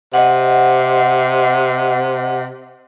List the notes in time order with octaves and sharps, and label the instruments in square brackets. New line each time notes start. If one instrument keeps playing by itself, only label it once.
[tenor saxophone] C3 [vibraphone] D#5 F#5